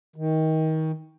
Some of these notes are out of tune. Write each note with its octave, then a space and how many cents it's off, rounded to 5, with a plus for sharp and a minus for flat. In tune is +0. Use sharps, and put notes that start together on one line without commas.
D#3 +25